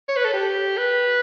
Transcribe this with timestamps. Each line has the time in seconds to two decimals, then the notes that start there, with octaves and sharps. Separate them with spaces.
0.08 C#5
0.16 B4
0.25 A4
0.33 G4
0.77 B4